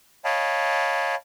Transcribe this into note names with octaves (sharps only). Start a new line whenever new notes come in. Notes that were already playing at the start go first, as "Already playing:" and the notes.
C#5 D#5 F5 G5 A5 B5